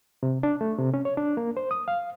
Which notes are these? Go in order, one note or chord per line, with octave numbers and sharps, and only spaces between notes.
C3
D4
A3
C3
C#4
C#5
D4
A#3
C5
D#6
F5